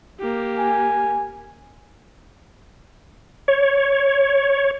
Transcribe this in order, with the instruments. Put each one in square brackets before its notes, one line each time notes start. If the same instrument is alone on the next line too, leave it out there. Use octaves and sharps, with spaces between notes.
[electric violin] A#3 G4
[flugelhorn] G#5
[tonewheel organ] C#5